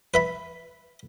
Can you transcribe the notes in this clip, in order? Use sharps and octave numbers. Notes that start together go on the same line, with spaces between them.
B4 E5 B5